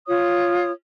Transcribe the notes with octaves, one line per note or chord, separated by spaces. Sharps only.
F4 C#5 D#6